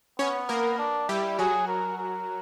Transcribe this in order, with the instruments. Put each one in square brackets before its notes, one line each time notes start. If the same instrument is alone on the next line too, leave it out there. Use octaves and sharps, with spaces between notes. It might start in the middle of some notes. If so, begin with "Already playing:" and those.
[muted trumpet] B3 [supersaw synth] C#4 C#5
[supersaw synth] A#3 A#4
[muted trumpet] D4
[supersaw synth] G3 G4 [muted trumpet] E4
[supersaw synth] F#3 F#4 [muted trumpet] G#4
[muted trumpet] A#4
A#4